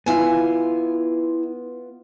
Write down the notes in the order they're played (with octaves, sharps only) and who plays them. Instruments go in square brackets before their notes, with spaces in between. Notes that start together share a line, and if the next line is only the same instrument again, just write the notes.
[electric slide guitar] B3 F4 [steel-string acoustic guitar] E4 G#5